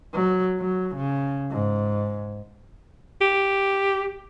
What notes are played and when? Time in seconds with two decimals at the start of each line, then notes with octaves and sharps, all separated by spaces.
0.14 F#3
0.59 F#3
0.96 C#3
1.50 G#2
3.21 G4